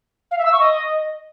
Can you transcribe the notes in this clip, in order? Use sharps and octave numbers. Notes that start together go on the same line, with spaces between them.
F5
E5
E6
C#6
D#5